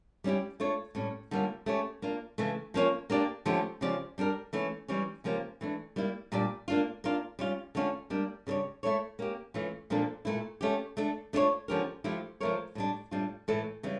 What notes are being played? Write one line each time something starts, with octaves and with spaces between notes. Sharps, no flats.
G3 C#4 E4 G4
A3 D4 F4 C#5
A2 G3 C#4
D3 G3 A#3 C#4 F4
A3 C#4 G4 C#5
A#3 D4 F4
C#3 E3 A3
F3 A#3 C#4 F4 C#5
A#3 D4 G4 D5
D3 F3 A3 C#4 G4
C#3 F3 C#4 G4 D5
G3 D4 G4 A#4
E3 A3 C#4 E4
E3 G3 C#4 G4 C#5
C#3 F3 A#3 C#4 G4
E3 A3 D4
G3 A#3 E4
A#2 G3 D4 G4 D5
A#3 D4 F4
A#3 D4 F4
G3 C#4 F4
D3 A3 C#4 F4
G3 A#3 D4
C#3 G3 D4 A4 C#5
A3 E4 A4 C#5
A#3 C#4 G4
E3 A3 C#4 F4
A#2 F3 A#3 D4 A4
A#2 A3 E4
A3 C#4 G4
A3 D4 A4
A3 D4 F4 A4 C#5
D3 F3 C#4 G4 A#4
F3 A3 E4 G4
F3 A3 E4 A#4 C#5
A2 G3 D4
A2 G3 D4 F4
A2 E3 A3 E4 A4
C#3 E3 G3